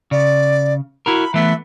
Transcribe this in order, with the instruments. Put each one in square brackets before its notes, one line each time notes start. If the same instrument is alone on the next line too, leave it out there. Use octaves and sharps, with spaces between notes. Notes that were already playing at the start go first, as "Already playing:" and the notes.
[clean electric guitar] C#3 [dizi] D5
[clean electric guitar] E4 F#4 A#4 [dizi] B5
[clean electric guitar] E3 A3 B3 [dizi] E5